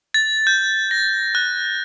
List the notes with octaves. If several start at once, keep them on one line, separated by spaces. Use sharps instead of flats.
A6
G6
A#6
F#6